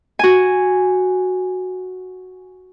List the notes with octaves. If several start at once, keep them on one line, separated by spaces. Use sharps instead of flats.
F#4 G#5